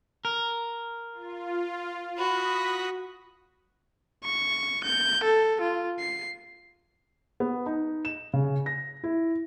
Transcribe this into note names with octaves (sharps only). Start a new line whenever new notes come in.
A#4
F4
F#4 B5 D#6 A#6 B6
C#6
G6
A4
F4
C7
B3
D#4
E7
C#3
A#6
E4